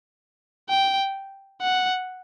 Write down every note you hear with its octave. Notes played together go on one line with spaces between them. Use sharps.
G5
F#5